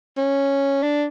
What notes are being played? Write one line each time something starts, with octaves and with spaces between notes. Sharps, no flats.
C#4
D4